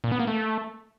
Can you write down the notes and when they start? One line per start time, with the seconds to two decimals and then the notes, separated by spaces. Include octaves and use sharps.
0.04 A#2
0.12 B3
0.20 A#3
0.27 A3